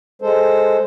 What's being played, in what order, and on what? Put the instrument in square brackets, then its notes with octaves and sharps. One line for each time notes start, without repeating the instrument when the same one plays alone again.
[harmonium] G#3 A4 C5